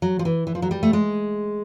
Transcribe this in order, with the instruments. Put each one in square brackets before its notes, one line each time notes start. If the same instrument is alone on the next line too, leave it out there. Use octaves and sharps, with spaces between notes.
[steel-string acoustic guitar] F#3
F3
E3
E3
F3
F#3
G3
A3
G#3